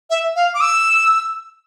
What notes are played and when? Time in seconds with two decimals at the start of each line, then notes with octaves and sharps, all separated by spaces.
0.10 E5
0.36 F5
0.55 D6
0.61 E6